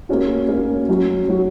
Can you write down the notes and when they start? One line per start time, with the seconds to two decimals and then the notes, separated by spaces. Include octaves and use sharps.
0.09 A#3 C#4 F#4
0.49 A#3 C#4 F#4
0.89 F#3 C#4 F#4
1.29 F#3 C#4 F#4